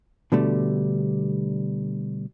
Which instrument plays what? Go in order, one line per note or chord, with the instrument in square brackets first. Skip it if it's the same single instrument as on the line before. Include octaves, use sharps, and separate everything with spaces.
[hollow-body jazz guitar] B2 D3 G3 A3